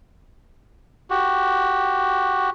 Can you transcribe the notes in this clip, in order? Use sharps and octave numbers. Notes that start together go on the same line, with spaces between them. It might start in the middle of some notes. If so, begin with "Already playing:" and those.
F#4 G4